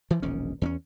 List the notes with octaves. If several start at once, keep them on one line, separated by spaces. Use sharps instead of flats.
E3 F3
E1 A#1 D#3 C#4
E2 C4 C#4